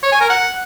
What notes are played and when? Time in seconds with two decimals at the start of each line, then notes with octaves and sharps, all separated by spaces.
0.03 C#5
0.12 G#5
0.21 A#4
0.30 F#5